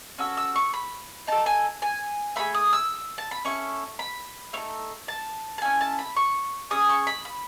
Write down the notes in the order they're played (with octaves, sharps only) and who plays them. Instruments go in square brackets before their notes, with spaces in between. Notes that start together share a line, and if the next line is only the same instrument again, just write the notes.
[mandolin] C#4 F#4 A4 E6
E6
C#6
B5
D#4 A4 A5
G#5
G#5
A3 D#4 G#4 B5
D#6
E6
A5
B5
C#4 E4 A4 C#6
B5
A3 D#4 A4 C#5
A5
A5
C#4 E4 A4 G#5
A5
B5
C#6
C#4 G#4 D#6
C#6
B5
B5